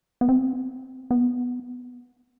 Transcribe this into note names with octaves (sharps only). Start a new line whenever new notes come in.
B3
C4
B3